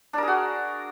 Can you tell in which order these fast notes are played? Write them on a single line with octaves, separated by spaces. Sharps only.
D4 A#4 G#4 F#4